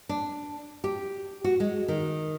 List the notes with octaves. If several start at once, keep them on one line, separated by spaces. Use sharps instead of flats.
D4
G4
F#4
G#3
D#3